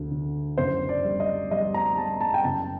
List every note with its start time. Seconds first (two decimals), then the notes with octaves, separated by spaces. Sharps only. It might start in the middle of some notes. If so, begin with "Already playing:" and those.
Already playing: D2 D3
0.11 D3
0.58 F#1 C5
0.89 D5
1.04 G3
1.20 D#5
1.51 G3 D#5
1.74 A#5
1.97 G3 A5
2.21 A5
2.34 G5
2.44 F#1 A5